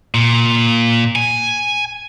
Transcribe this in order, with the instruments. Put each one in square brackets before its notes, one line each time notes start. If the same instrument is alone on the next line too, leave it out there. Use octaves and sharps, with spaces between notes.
[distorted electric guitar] A#2
G#5